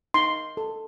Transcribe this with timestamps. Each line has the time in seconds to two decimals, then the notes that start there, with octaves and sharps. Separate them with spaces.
0.14 D#4 C6
0.57 A4